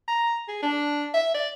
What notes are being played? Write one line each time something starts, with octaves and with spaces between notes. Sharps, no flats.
A#5
G#4
D4
E5
D5